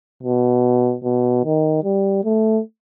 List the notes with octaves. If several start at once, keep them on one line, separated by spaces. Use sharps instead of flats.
B2
B2
D#3
G3
A3